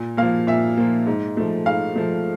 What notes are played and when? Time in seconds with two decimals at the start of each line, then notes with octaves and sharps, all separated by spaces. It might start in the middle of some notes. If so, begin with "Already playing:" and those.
Already playing: A#2
0.17 A#3 F5
0.22 F3
0.47 A#2 E5
0.77 F3 A#3
1.06 G#2
1.37 F3 A3
1.66 G#2 F5
1.95 F3 A3